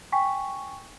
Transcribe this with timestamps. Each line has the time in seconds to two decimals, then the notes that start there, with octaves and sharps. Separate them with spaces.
0.12 G5 G#5 C#6 B6